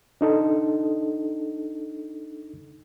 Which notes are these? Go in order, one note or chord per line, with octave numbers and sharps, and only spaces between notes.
D4 D#4 A4